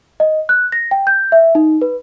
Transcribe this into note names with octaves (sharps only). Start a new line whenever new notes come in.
D#5
F#6
A#6
G5
G6
E5
D#4
B4